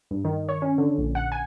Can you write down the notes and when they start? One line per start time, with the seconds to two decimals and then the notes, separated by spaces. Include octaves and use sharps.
0.11 G2
0.24 D#3
0.49 C#5
0.62 C#4
0.78 D3
0.98 A#1
1.15 F#5
1.32 G#5